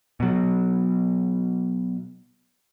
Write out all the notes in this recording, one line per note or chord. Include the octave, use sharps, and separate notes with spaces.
B2 F#3